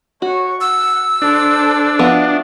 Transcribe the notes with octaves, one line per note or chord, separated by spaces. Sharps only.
F#4 C#5 C#6
F#5 E6
D4 A4 C5
F3 B3 F#4 E5